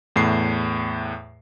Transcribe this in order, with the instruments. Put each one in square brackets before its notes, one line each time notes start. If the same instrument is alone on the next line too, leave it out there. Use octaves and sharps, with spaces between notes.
[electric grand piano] E2 A2 C7